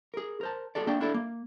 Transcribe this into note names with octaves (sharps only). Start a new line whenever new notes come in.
G#4 A#4
A#4 C5 A5
F#4 G#4 A4 D5
A#3 D4 D5 G5
D4 E4 A4 D5
A#3